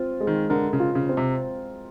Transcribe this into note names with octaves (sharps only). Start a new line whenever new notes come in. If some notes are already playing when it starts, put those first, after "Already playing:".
Already playing: C4 F4
G#3
D#3
D3 A#4
C#3
F4
C#3
C4
C3